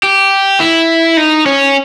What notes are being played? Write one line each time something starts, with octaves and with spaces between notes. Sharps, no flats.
G4
E4
D#4
C#4